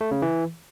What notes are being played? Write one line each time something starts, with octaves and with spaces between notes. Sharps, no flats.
A3
C#3
E3